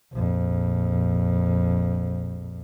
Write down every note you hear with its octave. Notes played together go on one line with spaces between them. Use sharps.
A#1 F2